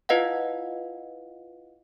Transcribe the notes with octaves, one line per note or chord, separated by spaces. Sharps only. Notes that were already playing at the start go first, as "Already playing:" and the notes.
E4 F4 B4 D#5 F5 F#5